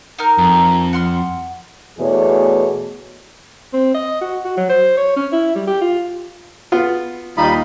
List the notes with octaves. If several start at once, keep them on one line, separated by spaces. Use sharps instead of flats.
D#4 A#4 F6
F2
F#5 C6 F6
E2 B2 A3 G#4 C#5 D5
C4
D#5
F#4
F#4
F#3
C5
C#5
C#4
E4
G3
G4
F4
B3 F4
D#2 G3 D#4 F4 D#5 B5